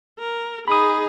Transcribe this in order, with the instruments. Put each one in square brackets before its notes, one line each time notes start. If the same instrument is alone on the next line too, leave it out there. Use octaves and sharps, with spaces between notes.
[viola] A#4
[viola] D#4 G#4 [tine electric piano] B5 D#6